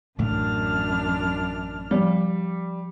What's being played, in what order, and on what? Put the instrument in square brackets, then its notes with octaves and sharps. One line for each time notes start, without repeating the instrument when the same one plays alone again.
[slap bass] A1 A2 A3 [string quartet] F#2 D4 F6
[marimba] F3 [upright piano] G3